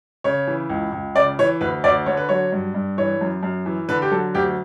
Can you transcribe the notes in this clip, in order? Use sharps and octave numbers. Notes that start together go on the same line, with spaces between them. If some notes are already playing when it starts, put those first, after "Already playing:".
C#3 C#5
E3
C#2
C#2
C#3 D5
E3 C#5
D2 B4
D2 D5
D3 C#5
B4
F#3 C#5
G2
G2
E3 C#5
F#2
F#2
E3
D3 B4
G4
F#3 A4
D2 G4